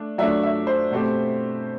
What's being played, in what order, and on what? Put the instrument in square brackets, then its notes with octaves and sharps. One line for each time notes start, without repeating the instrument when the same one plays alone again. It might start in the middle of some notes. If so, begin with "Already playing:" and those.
Already playing: [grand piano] A3 D4
[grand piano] F#3 A3 D4 [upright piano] E5
[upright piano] E5
C5
[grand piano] B2 A3 C4 G4